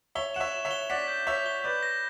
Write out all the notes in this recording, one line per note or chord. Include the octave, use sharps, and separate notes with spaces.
C#5 E5 G7
F#5 E7
C#5 E5
E7
C#5 E5
G7
D5 F#5 B6
G6
C#5 E5 B6
G7
B4 D5 G6
A#6